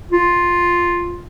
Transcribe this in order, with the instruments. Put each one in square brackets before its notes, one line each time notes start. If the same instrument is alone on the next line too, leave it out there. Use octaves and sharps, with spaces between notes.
[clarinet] F4